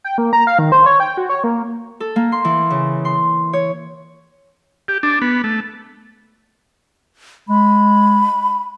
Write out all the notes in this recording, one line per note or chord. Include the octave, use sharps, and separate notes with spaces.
G5
A#3
A#5
F5
D#3
C5
C#5
G5
F#4
C#5
A#3
A4
A#3
C6
E3
C#3
C6
C#5
G4
D4
B3
A3
G#3 B5